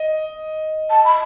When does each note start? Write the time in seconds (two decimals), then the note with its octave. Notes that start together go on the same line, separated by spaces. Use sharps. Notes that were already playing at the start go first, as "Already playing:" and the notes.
Already playing: D#5
0.90 A5
1.05 B5